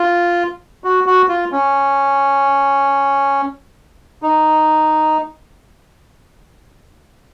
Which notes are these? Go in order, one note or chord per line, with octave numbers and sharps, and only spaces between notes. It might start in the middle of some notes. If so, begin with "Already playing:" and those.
Already playing: F4
F#4
F#4
F4
C#4
D#4